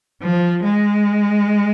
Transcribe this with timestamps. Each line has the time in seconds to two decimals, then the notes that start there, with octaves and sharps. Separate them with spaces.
0.22 F3
0.64 G#3